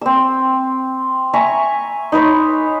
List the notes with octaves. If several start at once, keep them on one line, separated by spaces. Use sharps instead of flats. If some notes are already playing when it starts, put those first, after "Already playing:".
C4 E6
E5 G#5 A#5 C#6
D#4 B4 C#5 C6